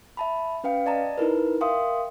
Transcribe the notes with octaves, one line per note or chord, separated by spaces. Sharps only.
E5 A5 B5
C#4 B4 F5 G5
D5 D#5 A5 A#5
D#4 E4 A#4 B4
A#4 E5 F5 G5 C6 D#6